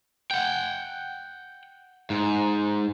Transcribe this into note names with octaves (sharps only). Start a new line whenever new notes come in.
F#5 G5
G#2